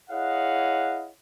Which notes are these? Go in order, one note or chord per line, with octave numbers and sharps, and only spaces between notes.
E4 G#4 C#5 D#5 F5 F#5